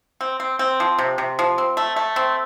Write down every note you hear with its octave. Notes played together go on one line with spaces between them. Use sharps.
C4
C4
C4
F3
C3
C3
F3
C4
A3
A3
C4